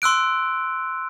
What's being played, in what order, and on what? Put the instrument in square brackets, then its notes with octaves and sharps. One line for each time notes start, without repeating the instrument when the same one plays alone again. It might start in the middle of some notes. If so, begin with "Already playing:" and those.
[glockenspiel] C6 E6 F#6 D7